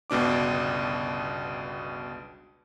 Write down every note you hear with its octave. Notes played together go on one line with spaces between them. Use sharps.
G1 C#2 B2 D4 D6